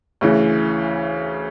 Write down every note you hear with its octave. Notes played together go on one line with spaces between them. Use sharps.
D2 C#3 E3